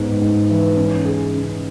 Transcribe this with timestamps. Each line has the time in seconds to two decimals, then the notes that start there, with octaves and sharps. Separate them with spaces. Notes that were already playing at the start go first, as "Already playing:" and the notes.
Already playing: G#2 B3
0.21 G#2
0.50 E3
0.77 C#4
1.05 G#4
1.33 C#3